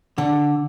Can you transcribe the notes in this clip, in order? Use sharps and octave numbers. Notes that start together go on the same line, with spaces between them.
D3